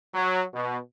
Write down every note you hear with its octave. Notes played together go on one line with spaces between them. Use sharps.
F#3
B2